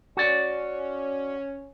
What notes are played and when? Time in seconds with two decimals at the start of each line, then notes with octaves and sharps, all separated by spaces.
0.17 C#4 F#4 C#5 D5